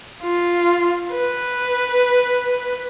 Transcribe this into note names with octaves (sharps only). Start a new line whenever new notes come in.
F4
B4